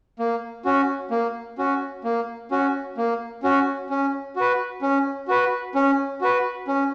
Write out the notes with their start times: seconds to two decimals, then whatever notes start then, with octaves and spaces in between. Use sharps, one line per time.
0.19 A#3
0.65 C#4 F#4
1.11 A#3
1.58 C#4 F#4
2.04 A#3
2.51 C#4 F#4
2.97 A#3
3.43 C#4 F#4
3.90 C#4
4.36 F#4 B4
4.82 C#4
5.28 F#4 B4
5.75 C#4
6.21 F#4 B4
6.67 C#4